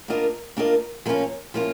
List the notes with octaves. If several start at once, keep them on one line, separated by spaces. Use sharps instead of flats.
A#3 D4 F4 A#4 D#5
A#3 D4 F4 A#4 D#5
F3 A#3 C#4 F4
F3 A#3 C#4 F4